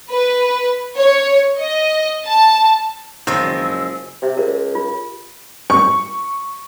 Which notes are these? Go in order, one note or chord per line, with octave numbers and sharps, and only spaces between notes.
B4
C#5
D#5
A5
F#1 D#3 F3 G#3 C4 E6
C3 G4 E5
C#2 A#4
F4
C#6